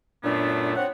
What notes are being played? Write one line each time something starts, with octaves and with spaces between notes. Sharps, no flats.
F#2 A#2 A3 B3 D4
C4 C#5 F#5